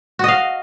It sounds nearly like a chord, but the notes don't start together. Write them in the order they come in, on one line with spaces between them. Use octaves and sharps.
F#4 D#5 F5